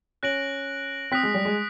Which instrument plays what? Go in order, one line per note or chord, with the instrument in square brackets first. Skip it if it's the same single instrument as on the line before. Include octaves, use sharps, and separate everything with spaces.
[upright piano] C#4 [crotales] F#6 A#6 D7 F#7
[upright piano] C4 [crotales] D#6 F#6 B6
[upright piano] G#3
G3
G#3